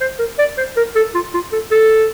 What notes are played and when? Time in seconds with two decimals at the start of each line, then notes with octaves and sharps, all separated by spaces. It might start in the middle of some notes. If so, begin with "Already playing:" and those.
0.01 C5
0.19 A#4
0.39 D5
0.58 C5
0.77 A#4
0.96 A4
1.15 F4
1.34 F4
1.53 A4
1.71 A4